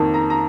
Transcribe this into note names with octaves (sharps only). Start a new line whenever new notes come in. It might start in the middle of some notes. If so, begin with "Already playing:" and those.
Already playing: F2 D#3 A#3
A#5
A#5